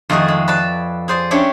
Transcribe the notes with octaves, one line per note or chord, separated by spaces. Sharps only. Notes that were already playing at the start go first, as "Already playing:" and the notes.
F2 D#3 A3 F#4 G#4 D#5
G#3
B4 D5 A5
G#4 C5 D5
C#4 D4 G4 C#5 E5